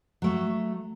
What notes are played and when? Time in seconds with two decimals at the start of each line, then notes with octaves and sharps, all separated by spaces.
0.22 F#3 A3